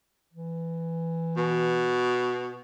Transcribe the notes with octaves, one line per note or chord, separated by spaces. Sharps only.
E3
B2